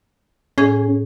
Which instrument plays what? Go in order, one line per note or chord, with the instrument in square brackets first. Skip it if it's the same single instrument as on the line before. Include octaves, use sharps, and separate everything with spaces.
[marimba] A2 G#4 [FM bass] C#4